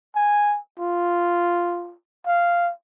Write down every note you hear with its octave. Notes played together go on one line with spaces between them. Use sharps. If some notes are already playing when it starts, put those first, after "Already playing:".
G#5
F4
F5